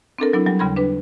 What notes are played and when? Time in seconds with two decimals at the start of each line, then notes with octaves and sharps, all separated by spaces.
0.19 C4 D4 A4 A#4
0.33 F#3 B3 D4 E4
0.46 F#3 G3 B3 G4
0.59 D#2 C#3 G3 B5 C6 G#6
0.77 D4 B4